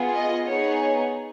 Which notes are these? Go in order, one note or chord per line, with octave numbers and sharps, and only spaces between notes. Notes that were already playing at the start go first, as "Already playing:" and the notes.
Already playing: B3 F4 G#4
D#5
B3 D#4 G#4 C#5